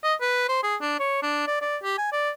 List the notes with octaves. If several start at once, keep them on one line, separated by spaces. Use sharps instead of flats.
D#5
B4
C5
G#4
D4
C#5
D4
D5
D5
G4
G#5
D5